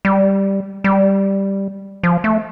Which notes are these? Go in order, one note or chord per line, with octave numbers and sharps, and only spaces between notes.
G3
G3
F3
A3